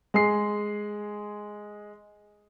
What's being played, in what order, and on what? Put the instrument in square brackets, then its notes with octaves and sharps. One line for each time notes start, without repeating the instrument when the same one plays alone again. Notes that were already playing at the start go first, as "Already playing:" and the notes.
[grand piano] G#3 G#4 C7